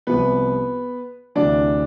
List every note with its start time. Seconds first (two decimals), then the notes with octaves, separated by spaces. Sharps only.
0.07 C2 C3 F3 B3 B4
1.35 D2 C3 E3 D4 D5